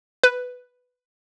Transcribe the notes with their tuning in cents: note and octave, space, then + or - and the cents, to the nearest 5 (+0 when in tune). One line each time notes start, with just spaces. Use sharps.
B4 +5